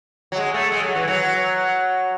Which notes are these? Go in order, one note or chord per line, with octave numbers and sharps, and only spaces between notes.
F#3
G#3
A3
G#3
F#3
E3
F#3